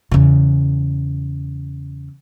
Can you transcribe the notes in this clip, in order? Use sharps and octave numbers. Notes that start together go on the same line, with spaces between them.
E2 C#3